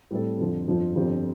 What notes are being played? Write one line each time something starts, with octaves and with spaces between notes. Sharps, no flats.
A2 G3 C4 A4
F2 D3 F3 C4
G1 F2 F3 C4 F4
G1 F2 F3 C4 G4